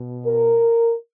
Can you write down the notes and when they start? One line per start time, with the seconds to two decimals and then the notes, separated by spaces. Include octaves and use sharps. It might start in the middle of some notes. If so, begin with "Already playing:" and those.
Already playing: B2
0.25 A#4